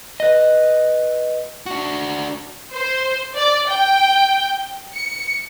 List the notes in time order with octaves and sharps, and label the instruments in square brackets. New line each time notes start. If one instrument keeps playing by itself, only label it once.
[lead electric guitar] B4 D#5
D4 F#4
[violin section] C5
D5
G5
C#7